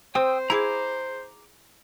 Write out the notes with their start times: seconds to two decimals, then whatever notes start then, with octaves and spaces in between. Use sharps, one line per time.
0.15 C4 C5 G5 D#6 E6
0.50 E4 G#4 A#5 D6